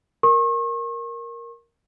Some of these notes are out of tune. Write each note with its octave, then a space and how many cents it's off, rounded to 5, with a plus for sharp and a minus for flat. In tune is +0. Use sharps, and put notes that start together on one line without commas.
A#4 +0 C#6 -40